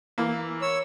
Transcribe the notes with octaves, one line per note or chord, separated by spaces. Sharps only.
E3 A#3
C#5 E6